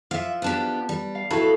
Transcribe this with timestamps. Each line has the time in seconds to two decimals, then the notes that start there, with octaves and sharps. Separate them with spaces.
0.11 F3 E5 F5
0.42 B3 D4 G4 B4 A5
0.89 G3
1.15 F5
1.31 E4 F#4 A4 B4 F5